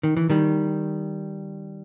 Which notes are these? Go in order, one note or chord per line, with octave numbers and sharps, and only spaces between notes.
D#3
E3
D#3 G3